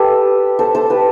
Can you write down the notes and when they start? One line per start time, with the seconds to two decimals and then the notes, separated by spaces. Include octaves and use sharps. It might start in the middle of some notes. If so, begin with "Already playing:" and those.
Already playing: G4 A4 B4
0.59 A4 C5
0.75 A4 C5
0.90 G4 B4